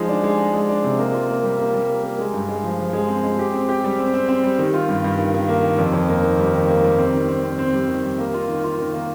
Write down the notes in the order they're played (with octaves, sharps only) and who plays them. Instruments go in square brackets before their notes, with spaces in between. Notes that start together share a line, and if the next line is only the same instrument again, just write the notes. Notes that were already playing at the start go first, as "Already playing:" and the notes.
Already playing: [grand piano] F3 G#3 D#4
D4
G#3
D4
G#3
D4
C3
A#3
F4
A#3
G3
A#3
G3
A#3
A#3
G#3
G2
G#3
F3
F3
G#3
C4
G#3
G4
C4
G4
G3
C4
C4
C4
G3
D#3
F4
G2
G2
D#3
D#3
A#3
D#3
F2
F2
A#3
D#3
G3
D#3
A#3
G3
C4
D#3
C4
C4
C4
G3
D#3
G3
A#3
F4
D#3
F4
D#3
A#3